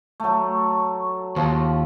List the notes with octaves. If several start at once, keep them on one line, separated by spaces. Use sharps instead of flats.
F#3 A3
D#2 F3